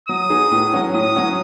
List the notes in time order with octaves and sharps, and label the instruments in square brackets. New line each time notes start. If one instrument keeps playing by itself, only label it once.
[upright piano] F#3 [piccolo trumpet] D#6
[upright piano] B3 D#4 G#4
A2
F#3 C#4 F#4
[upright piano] A2 [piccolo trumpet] D#6
[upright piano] F#3 C#4 F#4